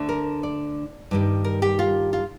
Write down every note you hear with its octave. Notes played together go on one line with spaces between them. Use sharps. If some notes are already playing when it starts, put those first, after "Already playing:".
Already playing: D2 D3 A3 D4
A#4
D5
G2 D#3 G3
A#4
G4
F4
F4